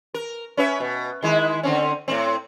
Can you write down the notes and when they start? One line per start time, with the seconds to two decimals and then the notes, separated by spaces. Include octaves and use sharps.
0.14 A#4
0.57 C#4 B4 E5
0.80 B2
1.22 D#3 G#3 E4
1.63 D3 C4 C#4
2.08 A2 D3 C4